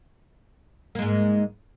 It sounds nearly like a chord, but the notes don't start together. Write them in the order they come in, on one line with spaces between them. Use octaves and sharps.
A#3 G#3 G#2